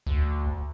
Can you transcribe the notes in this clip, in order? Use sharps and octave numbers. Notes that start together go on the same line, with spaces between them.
D2